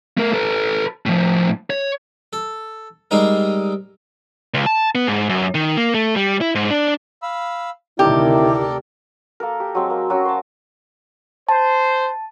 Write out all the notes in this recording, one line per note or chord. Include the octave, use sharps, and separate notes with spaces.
A3 A#4
A4 B4
A2 F3
C#5
A4
G3 G#3 C4 D#4 A#4
C#2
A5
B3
G#2
F#2
D#3
A#3
A3
G3
E4
G#2
D4
F5 B5 E6
D2 C3 D#3 E4 G4 A4 A#4 D5
A#3 A4 A#4
G4
F#3 G#3 C4
A#3
F#3 C#4 F#4
C5 A5
C5 A5